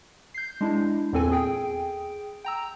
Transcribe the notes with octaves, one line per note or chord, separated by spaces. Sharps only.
G6 C7
G#3 D4 E4
E2 A#2 C4 A4 G#5
G#4 G5 D7
G5 A#5 E6